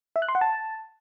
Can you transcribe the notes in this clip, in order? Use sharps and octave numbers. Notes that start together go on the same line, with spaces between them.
E5
F#6
C6
F#5
A5